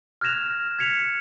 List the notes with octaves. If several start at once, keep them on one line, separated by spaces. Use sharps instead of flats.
F6 F#6 G#6 A#6 E7 F7
G#6 B6 C#7 F7